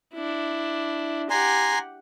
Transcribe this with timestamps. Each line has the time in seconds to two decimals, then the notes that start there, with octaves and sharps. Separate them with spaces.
0.14 D4 E4
1.30 G4 F#5 G#5 A#5 C6